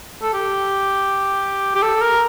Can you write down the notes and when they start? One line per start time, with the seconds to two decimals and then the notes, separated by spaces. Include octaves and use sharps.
0.22 A4
0.34 G4
1.75 G4
1.82 A4
2.02 A#4